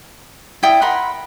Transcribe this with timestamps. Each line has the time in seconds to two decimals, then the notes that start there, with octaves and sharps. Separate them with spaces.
0.63 E4 D5 G5 D#6
0.82 A#4 F#5 B5 C6